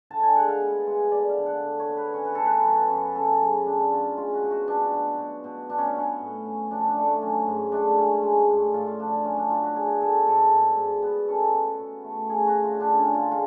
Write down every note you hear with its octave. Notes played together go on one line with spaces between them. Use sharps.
D3 A5
G#5
G#3 F#5
F5
B3
G#3
D3 D5
F5
D3
F#5
D3
C#5
B3
B4
C#4 C#5
B4
C#4 A4
B4
F#3
F#2
C#4 A4
F#3 G#4
C#4 D4
F#3 F4
G#3 F4
F#4
B2
F#4
B2 D4
B2
B2
B2
B2 D4
C#4
B3 C#4
A2
C#4
F3 D4
D4
A3
D4
F#3 C#4
G#2
A3 D4
C#4
G#3
A2
A2 F4
F4
F3 D4
F#3 C#4
D4
F#3 F4
F#4
B2 G#4
B2 A4
G#2 A4
G#2
G#2
B3
C#4 A4
B2
B2
A3
C#4 G#4
F#4
D3
F4
D3 D4
C#4
D3
F4
G#3 F4